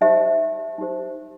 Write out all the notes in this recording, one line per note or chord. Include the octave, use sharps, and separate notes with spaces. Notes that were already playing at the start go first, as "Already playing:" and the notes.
D#4 G4 C5 E5
D#4 G4 C5